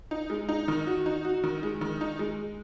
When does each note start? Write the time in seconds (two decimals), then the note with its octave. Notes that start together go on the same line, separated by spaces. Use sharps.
0.11 D#4
0.30 G#3
0.49 D#4
0.68 D#3
0.87 F#4
1.06 D#4
1.25 F#4
1.43 D#3
1.63 G#3
1.81 D#3
2.01 D#4
2.19 G#3